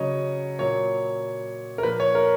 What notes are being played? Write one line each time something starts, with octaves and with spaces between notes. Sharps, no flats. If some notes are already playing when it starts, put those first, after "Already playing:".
Already playing: C#3 F#3 C#5 D#5
A#2 F#3 C#5
A#4
A#2 F3 B4
C#5
A#4